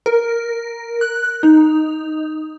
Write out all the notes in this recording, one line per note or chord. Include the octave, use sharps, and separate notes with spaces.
A#4
F#6
D#4